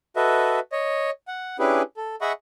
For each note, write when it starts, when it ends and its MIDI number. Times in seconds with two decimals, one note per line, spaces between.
0.16 0.60 66
0.16 0.60 69
0.16 0.60 71
0.16 0.60 75
0.16 0.60 76
0.72 1.10 73
0.72 1.10 75
1.28 1.57 78
1.59 1.82 61
1.59 1.82 62
1.59 1.82 64
1.59 1.82 67
1.59 1.82 68
1.59 1.82 71
1.97 2.16 69
2.21 2.32 68
2.21 2.32 75
2.21 2.32 76
2.21 2.32 78
2.21 2.32 83
2.21 2.32 85